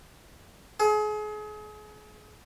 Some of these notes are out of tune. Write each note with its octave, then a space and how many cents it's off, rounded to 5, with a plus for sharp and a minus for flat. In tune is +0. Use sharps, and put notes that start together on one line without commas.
G#4 +35